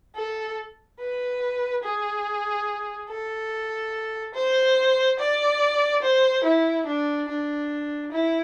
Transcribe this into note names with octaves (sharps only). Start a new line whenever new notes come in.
A4
B4
G#4
A4
C5
D5
C5
E4
D4
D4
E4